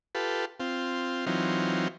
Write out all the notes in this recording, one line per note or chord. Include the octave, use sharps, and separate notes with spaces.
F4 G4 A4 B4
C4 F4
E3 F#3 C4 D#4 F4